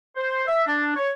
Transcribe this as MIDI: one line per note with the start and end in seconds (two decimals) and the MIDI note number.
0.16 0.43 72
0.47 0.63 76
0.66 0.93 62
0.95 1.08 73